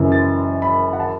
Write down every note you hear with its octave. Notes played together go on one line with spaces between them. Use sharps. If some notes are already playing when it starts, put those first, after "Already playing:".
Already playing: F#1 F#2 E3
A6
B5
F#5
A5